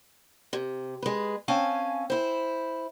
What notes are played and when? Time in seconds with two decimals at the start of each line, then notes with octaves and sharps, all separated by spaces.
0.53 C3
1.02 G#3 B4
1.48 C4 C#4 F5 G#5 A5
2.10 E4 C5